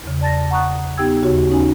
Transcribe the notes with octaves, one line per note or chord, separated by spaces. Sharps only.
E2 C#3
D5 A5 A6 A#6
F#5 A#5 C#6 D#6 F#6
B3 D#4 G4 G5 E6 G#6
D#2 C#3 F#4 C#5
C#4 D#4 G#5